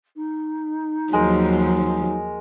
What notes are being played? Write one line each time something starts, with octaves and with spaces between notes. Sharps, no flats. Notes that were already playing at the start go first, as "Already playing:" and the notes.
D#4
D#2 F3 F#3 G#3 A#4